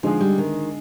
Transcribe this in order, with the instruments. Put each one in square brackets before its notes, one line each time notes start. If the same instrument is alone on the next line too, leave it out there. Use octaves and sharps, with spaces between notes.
[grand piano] D3 G#3 D#4 G#4 [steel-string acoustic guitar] F3
[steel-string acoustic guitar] G3
D#3